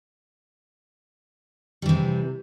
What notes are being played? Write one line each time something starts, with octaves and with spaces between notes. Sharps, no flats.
C3 E3 G3